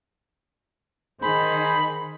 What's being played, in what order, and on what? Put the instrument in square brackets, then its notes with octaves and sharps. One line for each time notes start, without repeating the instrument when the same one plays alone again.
[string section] D#3 [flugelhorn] G#4 [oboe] C5 [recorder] B5